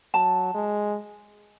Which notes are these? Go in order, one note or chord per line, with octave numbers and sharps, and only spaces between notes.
F#3 A5
G#3